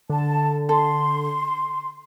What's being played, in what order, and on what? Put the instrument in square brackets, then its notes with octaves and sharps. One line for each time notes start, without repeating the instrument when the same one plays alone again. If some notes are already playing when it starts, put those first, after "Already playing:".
[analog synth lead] D3 [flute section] A5
[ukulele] A4 [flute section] C6